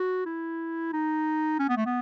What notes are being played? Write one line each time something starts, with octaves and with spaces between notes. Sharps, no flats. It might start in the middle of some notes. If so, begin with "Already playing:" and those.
Already playing: F#4
E4
D#4
C#4
B3
A3
B3